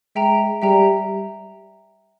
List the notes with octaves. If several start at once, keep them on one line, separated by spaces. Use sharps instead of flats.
G#3 E5 G5 A#5
G3 E5 G5 A#5